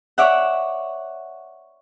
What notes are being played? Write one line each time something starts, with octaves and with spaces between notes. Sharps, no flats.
C#5 D5 E5 F#5